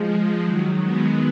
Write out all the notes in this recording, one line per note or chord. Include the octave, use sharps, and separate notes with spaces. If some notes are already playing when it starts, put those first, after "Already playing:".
Already playing: F3 G#3
D#3 F#3
G#3 B3